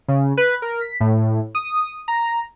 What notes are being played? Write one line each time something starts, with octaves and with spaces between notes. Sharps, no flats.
C#3
B4
A#4
B6
A2
D#6
A#5